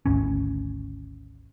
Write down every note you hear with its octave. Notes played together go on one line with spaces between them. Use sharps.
G#1 D2 C#4